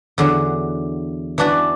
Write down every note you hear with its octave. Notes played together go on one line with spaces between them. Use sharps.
E2 D3 F#3
E3 D4 F#4 B4 D5